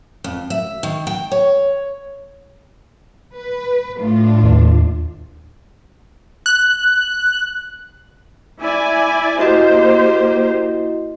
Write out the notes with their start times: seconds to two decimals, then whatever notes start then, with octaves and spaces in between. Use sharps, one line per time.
0.24 F2
0.50 E5
0.83 D#3
1.07 G5
1.32 C#5
3.33 B4
3.99 A2 D4 F4
4.43 D#2
6.46 F#6
8.61 E4 D5 G#5
9.39 A#3 E4 F#4 G4 C5 D#5